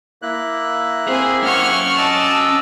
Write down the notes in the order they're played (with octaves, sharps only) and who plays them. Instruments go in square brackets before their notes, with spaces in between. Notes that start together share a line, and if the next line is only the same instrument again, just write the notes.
[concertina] A#3 E4 F#6
[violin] C4 G#5 [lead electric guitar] G#4
[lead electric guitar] C#4 F#5 [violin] C#6 F6
[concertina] D#5 D6 E6 [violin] A5